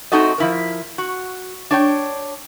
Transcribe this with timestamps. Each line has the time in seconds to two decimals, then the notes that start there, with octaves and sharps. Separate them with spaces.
0.12 A3 C4 D#4 F#4 A4 D#5
0.38 F3 E4 A#4
0.98 F#4
1.71 D4 C#5 G5